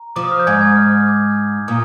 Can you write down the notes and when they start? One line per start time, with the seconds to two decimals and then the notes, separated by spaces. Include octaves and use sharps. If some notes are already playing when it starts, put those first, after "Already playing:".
Already playing: A#5
0.16 F3 D6
0.24 D#6
0.31 F6
0.39 G6
0.47 G#2 G#5 G#6
0.61 G#5 G#6
0.77 F6
0.92 F6
1.07 D6
1.68 A#2 D#6